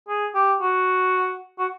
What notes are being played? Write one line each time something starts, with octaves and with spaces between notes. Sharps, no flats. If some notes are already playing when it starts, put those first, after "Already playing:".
G#4
G4
F#4
F#4